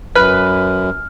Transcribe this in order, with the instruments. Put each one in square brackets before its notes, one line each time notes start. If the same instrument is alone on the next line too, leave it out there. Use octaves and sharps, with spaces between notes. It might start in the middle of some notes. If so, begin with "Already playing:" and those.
[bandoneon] F#2 [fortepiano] B4 [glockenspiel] F6